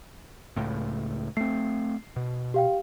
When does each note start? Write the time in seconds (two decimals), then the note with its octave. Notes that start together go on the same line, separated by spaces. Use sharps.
0.56 C#2 A2
1.37 A3 C4 C7
2.16 B2
2.54 G4 F5 G5